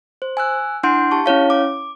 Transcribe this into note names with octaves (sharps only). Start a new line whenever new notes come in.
C5
G#5 E6 F#6
D4 E4 F#5 C6 G6 D7
G4 A5 C#6
C#4 E4 C#5 F5
D6